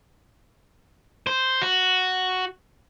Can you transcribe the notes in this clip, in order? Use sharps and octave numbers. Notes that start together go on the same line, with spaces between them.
C5
F#4